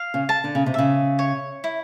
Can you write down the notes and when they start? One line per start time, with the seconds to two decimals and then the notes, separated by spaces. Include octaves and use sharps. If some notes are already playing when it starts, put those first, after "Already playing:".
Already playing: F5
0.14 C#3
0.29 A5
0.44 D3
0.55 C#3
0.66 C3
0.74 C#3 E5
1.19 C#5
1.64 E4